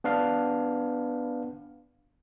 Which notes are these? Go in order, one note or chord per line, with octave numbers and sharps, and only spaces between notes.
B3 D4 B4 F5